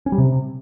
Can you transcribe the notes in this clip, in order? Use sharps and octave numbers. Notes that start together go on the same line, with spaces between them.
C#4
G3
C3